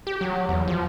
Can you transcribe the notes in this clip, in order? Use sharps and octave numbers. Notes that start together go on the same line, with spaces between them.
G4
F#3
E2
F3